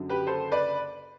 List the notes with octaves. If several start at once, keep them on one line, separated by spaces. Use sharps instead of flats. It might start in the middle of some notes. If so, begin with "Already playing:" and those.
Already playing: F#1 F#2 D3 F#3
G4 B4
A4 C5
B4 D5